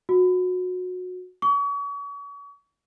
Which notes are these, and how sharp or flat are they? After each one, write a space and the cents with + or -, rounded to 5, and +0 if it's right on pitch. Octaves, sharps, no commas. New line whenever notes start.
F#4 -25
C#6 +40